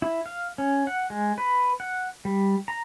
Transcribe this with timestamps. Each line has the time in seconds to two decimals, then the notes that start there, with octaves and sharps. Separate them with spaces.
0.02 E4
0.26 F5
0.58 C#4
0.87 F#5
1.10 G#3
1.38 B4
1.80 F#5
2.25 G3
2.68 A#5